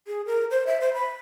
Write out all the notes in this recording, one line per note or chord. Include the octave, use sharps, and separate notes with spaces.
G#4
A#4
C5
E5
C5
B5